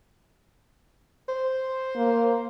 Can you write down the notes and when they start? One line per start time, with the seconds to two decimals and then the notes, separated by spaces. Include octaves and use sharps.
1.29 C5
1.96 A#3